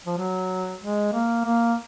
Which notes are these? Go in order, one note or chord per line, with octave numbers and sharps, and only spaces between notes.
F3
F#3
G#3
A#3
A#3